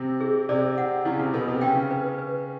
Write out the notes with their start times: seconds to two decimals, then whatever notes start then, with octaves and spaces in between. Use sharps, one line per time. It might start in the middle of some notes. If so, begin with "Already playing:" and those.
Already playing: C3 C4
0.21 G#4
0.49 C3 C4 D5
0.78 F#5
1.05 C#3 C#4 E4
1.19 C3 C4
1.33 B2 B3 A4
1.48 C3 C4
1.61 C#3 C#4 G5
1.91 B4
2.18 B4